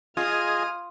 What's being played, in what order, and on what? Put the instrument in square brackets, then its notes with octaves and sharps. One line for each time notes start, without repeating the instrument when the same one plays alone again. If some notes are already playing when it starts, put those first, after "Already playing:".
[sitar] F4 [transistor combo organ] G#4 D#5 [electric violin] D#6 F6